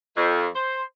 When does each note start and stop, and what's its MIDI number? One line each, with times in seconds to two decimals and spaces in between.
0.17 0.47 41
0.56 0.83 72